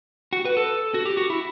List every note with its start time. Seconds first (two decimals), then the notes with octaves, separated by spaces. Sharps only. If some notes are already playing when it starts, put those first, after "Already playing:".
0.33 F#4
0.45 B4
0.57 A4
0.94 F#4
1.05 G4
1.17 F#4
1.30 E4